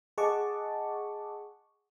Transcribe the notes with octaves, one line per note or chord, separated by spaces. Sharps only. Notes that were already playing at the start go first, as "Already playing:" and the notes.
G#4 D#5 F#5 A5 C#6 D6